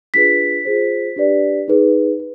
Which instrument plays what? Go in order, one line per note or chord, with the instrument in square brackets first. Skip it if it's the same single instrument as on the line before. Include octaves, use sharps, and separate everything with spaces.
[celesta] D4 F4 G#4 B4 B6
F4 G#4 C5
D4 G4 B4 D5
D#4 G#4 B4
B4